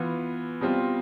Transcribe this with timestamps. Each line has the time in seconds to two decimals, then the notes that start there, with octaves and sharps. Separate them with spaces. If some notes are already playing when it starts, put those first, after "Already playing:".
Already playing: E3 B3 F4
0.61 B2 G3 C4 F4